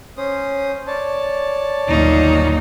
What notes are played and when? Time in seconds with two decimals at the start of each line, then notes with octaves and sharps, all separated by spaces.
0.17 C#4 C5 D#6
0.87 C#5 D5 A5
1.88 G1 D#2 A#2 F#3 D#4